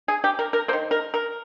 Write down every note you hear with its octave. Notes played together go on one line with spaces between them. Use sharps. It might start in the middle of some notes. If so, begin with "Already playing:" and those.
G#4
G4
A#4
A#4
A#3 C5
D#3
A#4
A#4